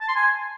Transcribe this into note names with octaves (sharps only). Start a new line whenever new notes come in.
A5
C6
G#5